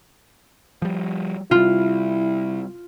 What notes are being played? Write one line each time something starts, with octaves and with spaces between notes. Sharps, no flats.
F3 G3
C3 G3 E4 F4